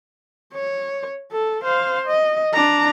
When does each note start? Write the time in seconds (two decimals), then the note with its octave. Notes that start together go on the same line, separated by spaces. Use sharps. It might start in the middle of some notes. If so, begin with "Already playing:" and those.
0.54 C#5
1.32 A4
1.63 C5 F5
2.07 D#5
2.53 D4 A#5